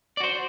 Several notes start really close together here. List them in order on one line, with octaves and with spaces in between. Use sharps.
D5 F#4 C5